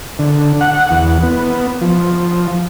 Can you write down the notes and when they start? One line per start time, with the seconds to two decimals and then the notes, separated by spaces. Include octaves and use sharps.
0.19 D3
0.61 F#5
0.91 E2
1.23 B3
1.81 F3